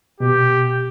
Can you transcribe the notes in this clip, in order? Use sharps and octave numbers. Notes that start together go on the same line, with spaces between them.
B2 G4